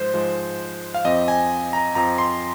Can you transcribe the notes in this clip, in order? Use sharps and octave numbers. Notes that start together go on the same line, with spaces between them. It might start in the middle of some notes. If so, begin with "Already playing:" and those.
Already playing: G#2 F3 G#3 C5
G#2 F3 G#3
F5
F2 F3 C4 D#5
G#5
A#5
F2 F3 C4 A#5
C6